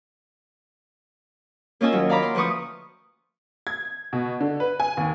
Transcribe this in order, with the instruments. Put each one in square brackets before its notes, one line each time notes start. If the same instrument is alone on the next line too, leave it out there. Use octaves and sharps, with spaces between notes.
[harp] A#3 C#4 F4 D#5 G#5 E6
D#2 F#3
D5 F5 A#5 B5 D6
C6
D2 F3 B4 C#6 D#6
[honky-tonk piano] G#6
B2
D3
B4
G#5
D#2